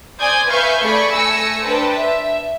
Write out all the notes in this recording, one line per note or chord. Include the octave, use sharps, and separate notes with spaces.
C5 D5 G#5 D#6 G6 G#6
B4 E5 F5 G#5 C#6 G6
A3 G#4 D5 B5 C#6
A3 G#5 E6 A#6 C#7
D4 B4 C5 G5 A5
E5